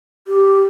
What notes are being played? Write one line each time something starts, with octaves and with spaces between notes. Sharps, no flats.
G4